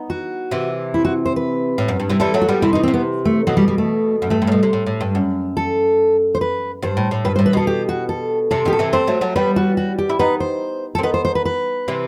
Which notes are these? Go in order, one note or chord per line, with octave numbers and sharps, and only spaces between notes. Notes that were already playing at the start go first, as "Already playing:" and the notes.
Already playing: B3 D#4
F#4
C3 E3
E4
F#4
C5
B4
A2
F#2
G2
C3 E3
E3 G3 A4
F#3 A3
F#4
G3 B3
C3 E4
D#4
B2
C4
C3
B3
A3
B2 F#3
G3
G3
A3
F#2
G2 A3
G2
A2
B2
C3
A2
A2
G2
F#2
A4
C5
B4
G2 C5
A2
A2
G2 B4
C5
A2
B4
B2 A4
G4
F#4
A4
C3 A4
B2 D#3 G4
A4
C3 E3
A3 C4 C5
F#3 A3
F#3 A3
G3 B3 B4
F#4
F#4
G4
E4
B3 D#4 B4
C5
A4
C4
B3 D#4 B4
C5
C5
B4
B4
C3 E3